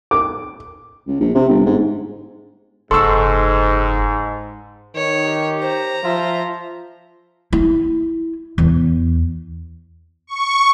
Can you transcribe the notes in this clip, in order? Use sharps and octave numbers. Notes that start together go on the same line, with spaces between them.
D6
C#2
A#1
C3
G1
G#2
F#1 G#2 A4 C6 C#6 E6
D#3 C#5
G4
C5 A#5
F3 F4 E5
E4
E2
C#6